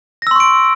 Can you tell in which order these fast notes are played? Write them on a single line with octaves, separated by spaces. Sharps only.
A#6 E6 C6 C#6 D7